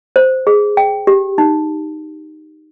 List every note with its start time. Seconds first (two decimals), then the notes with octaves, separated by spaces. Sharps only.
0.16 C5
0.47 G#4
0.77 G5
1.07 G4
1.38 D#4